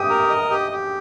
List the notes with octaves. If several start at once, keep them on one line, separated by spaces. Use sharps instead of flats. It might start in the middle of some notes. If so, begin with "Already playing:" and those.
Already playing: G4 D#6
A#4
D#5
G4
G4